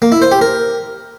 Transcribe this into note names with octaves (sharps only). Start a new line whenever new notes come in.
A#3
E4
C5
G4
A#4